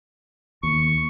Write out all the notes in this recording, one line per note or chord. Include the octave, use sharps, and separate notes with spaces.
D#2 C#6